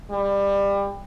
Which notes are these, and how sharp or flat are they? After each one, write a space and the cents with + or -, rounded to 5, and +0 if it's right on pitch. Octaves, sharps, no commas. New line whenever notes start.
G3 +25